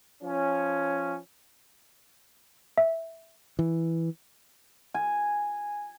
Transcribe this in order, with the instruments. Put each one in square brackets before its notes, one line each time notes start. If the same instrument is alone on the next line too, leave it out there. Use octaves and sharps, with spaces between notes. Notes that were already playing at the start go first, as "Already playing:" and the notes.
[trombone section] F3 C#4
[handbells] E5
[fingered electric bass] E3
[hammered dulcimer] G#5